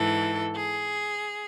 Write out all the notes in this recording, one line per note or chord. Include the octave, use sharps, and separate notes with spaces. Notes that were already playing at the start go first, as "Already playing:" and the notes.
Already playing: G#2 E3 A4
G#4